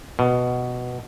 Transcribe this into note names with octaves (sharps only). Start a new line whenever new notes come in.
B2